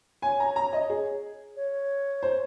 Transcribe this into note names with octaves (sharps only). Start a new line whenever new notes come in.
C#5 G#5
A#5
A#5
D#5
G#4
C#5
C5